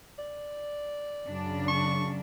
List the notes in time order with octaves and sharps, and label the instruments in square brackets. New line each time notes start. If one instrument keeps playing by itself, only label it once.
[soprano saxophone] D5
[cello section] F#2 C#3 D4
[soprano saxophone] C#6